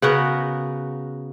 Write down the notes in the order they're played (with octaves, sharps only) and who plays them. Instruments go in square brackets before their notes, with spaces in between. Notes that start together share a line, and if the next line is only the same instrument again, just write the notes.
[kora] C#3 B3 F#4 A#4